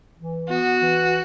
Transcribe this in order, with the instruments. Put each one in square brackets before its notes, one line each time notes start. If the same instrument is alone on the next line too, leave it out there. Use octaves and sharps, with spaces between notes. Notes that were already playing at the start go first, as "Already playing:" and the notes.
[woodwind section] E3
[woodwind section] B3 [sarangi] F#4
[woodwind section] E3